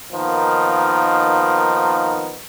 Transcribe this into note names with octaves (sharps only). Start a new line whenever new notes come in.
D#3 F3 A#3 B3 D#4 A#4